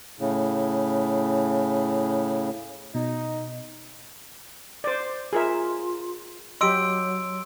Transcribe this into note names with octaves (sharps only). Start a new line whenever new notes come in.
A2 C#3
B2 D#4
C5 D5
F4 G#4 A#4 E5
F#3 G4 D#5 C6 E6 D7